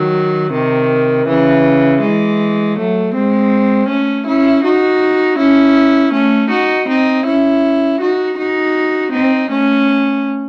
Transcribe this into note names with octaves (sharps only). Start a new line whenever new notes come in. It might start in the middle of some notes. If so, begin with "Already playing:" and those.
Already playing: D#3 F#3
C3 D#3
C#3 E3
E3 G#3
F#3 A3
G#3 C4
A3 C#4
C#4 E4
D#4 F#4
C#4 E4
A3 C#4
D#4 F#4
C4 D#4
C#4 E4
D#4 F#4
D#4 F#4
C4 D#4
A3 C#4